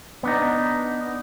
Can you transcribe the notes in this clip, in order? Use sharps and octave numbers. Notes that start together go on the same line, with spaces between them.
B3 D4 D#4